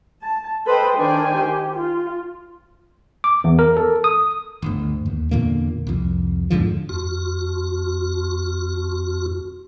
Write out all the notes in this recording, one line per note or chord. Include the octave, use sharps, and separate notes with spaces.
A5
A4 B4 C5 D#5 G5
D#3 D4 C5 G5 G#5
G4
F4
D6
E2
A#4
A4
D#6
G1 D2
D#2
E2 A#2 D3 A#3
C2 F2
E2 G#2 D3 F3
F2 F#4